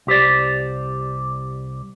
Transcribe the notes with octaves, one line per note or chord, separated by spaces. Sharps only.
C2 G4 C5 D5